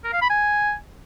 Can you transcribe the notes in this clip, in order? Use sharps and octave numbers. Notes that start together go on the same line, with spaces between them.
A#4
F5
B5
G#5